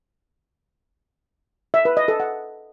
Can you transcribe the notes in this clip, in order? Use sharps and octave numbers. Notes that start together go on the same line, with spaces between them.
E5
B4
D#5
A4
F#5